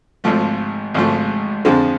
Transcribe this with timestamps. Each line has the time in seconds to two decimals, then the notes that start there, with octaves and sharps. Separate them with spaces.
0.24 G#1 G#2 F3 A3
0.94 G#1 G#2 F3 A3
1.65 F2 D3 F3 G#3 C4